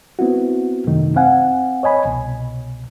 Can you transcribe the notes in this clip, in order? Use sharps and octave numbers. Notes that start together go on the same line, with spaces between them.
B3 C4 E4 F#4
F#2 C3 D#3 A3 D#4
C4 F5 F#5 G#5
C#5 D#5 G#5 B5
C2 B2